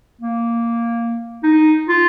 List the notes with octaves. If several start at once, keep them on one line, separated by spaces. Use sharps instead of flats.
A#3
D#4
F4